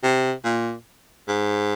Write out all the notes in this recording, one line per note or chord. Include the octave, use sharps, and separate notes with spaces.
C3
A#2
G#2